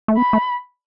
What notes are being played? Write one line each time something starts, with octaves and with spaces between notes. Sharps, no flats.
A3
B3 B5
A3